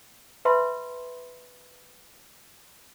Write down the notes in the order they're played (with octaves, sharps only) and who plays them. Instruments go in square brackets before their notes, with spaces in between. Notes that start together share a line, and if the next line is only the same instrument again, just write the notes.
[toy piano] B4 E5 A5 B5 C6